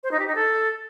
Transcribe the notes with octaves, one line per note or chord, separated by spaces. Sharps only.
C5
D#4
G4
D#4
A4